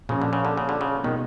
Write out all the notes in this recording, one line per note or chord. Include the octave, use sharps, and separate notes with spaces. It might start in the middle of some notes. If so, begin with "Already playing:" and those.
A#2 C#3 F3 A#3 C#4
D3
C#3
D3
C#3
D3
C#3
B2 D#3 G#3 B3 D#4